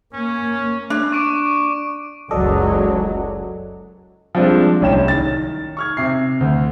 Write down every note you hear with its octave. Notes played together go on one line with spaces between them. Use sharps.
A#3 C#4
D4
C#6 D6 D7
F#1 C#2 F#3 A4 D5 D#5
F3 G3 G#3 C4 D4
D1 C2 C#4 G5 E7
D#3 A6
C#6 F6 G#6
C3 E5 C7
D2